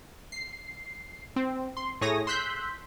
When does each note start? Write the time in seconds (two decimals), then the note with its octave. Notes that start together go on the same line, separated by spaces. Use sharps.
0.32 C7
1.36 C4
1.77 C6
2.01 A2 A3 G#4 C#5 D#6 A#6
2.27 C6 E6 F#6 G6 B6